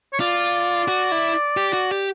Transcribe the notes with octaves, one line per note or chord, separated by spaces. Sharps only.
C#5
F4 D5
F#4
E4
G4
F#4
G4